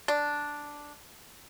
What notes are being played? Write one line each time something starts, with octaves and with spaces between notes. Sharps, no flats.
D4